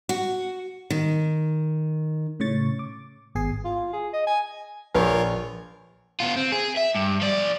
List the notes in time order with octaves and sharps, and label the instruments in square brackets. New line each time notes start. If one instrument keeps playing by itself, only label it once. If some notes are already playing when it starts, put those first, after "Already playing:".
[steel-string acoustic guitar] F#4
D#3
[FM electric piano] A2 C#3 C#5 C#6 A6
D6
G#1 B3 G#4 G#5 C7
[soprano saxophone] F4
G#4
D#5
G#5
[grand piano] A#1 [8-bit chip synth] F4 A#4 C#5 [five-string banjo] B4
[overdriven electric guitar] B3 F4
C4
G#4
E5
G2
F3 D5